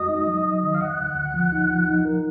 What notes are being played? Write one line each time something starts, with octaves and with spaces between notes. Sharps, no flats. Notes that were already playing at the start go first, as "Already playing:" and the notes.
Already playing: F2 G#3 F#4 D#5
D#4
F#3
F#3
D#3
F5
D2 F#5
D2
D2
F3
D#4
F3
D#4
A#4